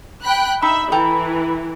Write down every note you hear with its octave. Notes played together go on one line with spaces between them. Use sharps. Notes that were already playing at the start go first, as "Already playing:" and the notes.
G5 B5 F#6
D#4 E5 B5
E3 A4 G5 A#5